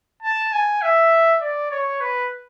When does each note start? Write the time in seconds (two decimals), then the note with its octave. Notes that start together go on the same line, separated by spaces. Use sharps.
0.23 A5
0.53 G#5
0.82 E5
1.41 D5
1.71 C#5
2.01 B4